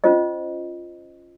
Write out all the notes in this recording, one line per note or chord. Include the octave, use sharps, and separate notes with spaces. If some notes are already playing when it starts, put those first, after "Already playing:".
C#4 F4 C5 D#5